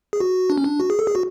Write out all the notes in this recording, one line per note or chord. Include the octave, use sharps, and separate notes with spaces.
G#4
F#4
D4
C#4
D4
F#4
G#4
A4
G#4
F#4